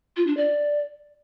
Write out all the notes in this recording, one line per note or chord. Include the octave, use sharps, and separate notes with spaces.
F4
D4
D5